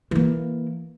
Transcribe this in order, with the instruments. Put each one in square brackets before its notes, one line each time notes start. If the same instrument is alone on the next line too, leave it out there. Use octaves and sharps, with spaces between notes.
[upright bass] E3 A#3